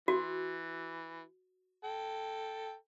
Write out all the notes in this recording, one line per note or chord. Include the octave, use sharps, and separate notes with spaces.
E3 F#4
A4 G5